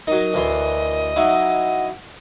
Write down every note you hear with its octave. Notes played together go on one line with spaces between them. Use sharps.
F#3 D#4 A#4 D#5
D2 E3 C6
F#3 D#4 E4 F#5